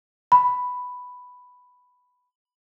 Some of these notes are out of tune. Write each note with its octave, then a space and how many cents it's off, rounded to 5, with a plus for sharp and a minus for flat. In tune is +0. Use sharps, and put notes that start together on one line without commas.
B5 +5